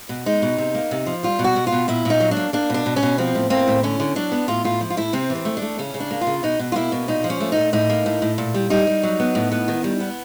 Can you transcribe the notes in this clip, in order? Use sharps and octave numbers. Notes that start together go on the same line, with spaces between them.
B2
G#3 D#4
B2
C3
A#3
C3
F3
G3 F4
B2
F#4
B2
F4
B2
A#2 E4
A#2 D#4
F#3
D4
A#3
A#3 D4
B2 D4
B2
C#4
B2
F3 C4
A2
A#3 C4
A2
D3 C#4
D3
F#3 D4
B3
A2 F4
A2 F4
F3
F4
A2 E4
C3 C4
E3
C4
A3
D4
A3
C#3 C#4
C#3
D4
A#3
F4
C#3
B2 D#4
B2
F4
A#3 E4
B2
A#2 D#4
F3
C#4
A3
A#2 D#4
A2 D#4
A#3
A2
A2
A#2
G3
G3 D#4
G3
F#3
B3
A2
B3
D#3
G3
B3